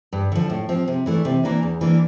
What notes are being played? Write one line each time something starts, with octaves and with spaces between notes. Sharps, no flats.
G2
D3 F3
A2
F3 C4
C3
E3 A3 D4
C3
E3 A#3 D4
E2
E3 A#3 D4